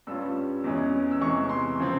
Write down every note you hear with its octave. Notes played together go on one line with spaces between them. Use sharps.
G2 G3 C#4 F4 E6
E2 E3 G#3 C#4
E6
E2 C3 E3 G#3 C#6
C6
C#3 F3 C4